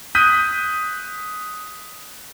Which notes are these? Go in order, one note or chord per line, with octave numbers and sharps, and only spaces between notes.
D#6 F#6 G6 B6 D#7